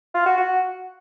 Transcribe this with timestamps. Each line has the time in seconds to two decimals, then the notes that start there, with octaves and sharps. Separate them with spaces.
0.14 F4
0.26 F#4
0.38 F#4